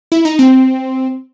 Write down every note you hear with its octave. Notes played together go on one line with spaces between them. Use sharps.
E4
D#4
C4